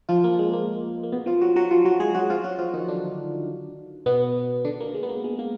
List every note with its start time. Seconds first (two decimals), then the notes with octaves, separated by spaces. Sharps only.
0.09 F3 F4
0.24 A#3
0.39 G#3
0.53 A#3
1.03 A#3
1.12 B2 B3
1.26 F3 F4
1.41 F#3 F#4
1.56 F#3 F#4
1.71 F3 F4
1.85 F#3 F#4
2.00 G#3 G#4
2.15 F#3 F#4
2.30 F3 F4
2.44 F#3 F#4
2.59 F3 F4
2.74 D#3 D#4
2.88 D3 D4
4.06 B2 B3
4.65 D3 D4
4.80 A#3
4.94 G#3
5.03 B3
5.09 A#3
5.24 G#3
5.39 A#3